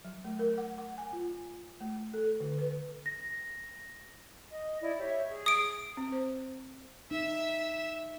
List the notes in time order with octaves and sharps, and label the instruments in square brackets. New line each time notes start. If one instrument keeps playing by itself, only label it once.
[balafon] F#3
A3
A#4
F#5
F#5
G#5
F4
A3
A4
D3
B4
[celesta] A#6
[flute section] D#5
E4 D5 D#5
G4 C#5 E5
G#4
[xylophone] D#6 D7
[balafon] C4
C5
[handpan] D#4 [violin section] E5